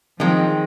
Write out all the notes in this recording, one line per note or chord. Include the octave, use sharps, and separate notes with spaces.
D#3 F3 G#3 C4